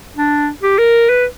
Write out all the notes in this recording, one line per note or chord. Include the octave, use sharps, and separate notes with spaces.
D4
G4
A#4
B4